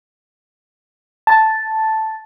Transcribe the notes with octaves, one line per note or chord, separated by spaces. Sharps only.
A5